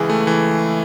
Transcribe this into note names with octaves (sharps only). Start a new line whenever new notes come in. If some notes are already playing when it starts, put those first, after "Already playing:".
Already playing: C#2 E3 G#4
A3
E3